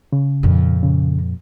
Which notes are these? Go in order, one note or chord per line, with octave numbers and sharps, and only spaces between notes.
C#3
F2 A#2
C#3